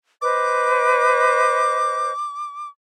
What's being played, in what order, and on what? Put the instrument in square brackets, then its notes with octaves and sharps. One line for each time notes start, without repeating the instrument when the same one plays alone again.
[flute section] B4 C5 D#5 [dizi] D6